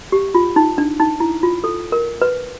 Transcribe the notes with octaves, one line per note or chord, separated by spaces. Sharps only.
G4
F4
D#4
D4
D#4
E4
F4
A4
A#4
B4